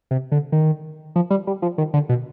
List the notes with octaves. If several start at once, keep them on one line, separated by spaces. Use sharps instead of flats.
C3
D3
D#3
F3
G3
G3
F3
D#3
D3
B2